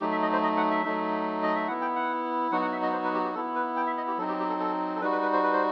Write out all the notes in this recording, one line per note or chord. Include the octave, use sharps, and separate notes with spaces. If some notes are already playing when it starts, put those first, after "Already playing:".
F#3 A3 D#4 G4
E5
D#5
C5
D#5
F#5
E5
F#3 A3 D#4
D#5
E5
B3 E4 F#5
G5
F#5
F#3 B3 D#4 F#4 F#5
F#5
E5
D#5
C5
B4
G4
G4
B3 E4 A4
B4
G5
E5
D#5
G4
F#3 C4 D#4 A4
G4
G4
A4
A4
A4
G3 D#4 F#4 B4
B4
B4
C5
B4
C5